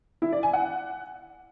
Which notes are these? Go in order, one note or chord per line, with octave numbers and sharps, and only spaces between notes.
E4
D5
G#5
F#5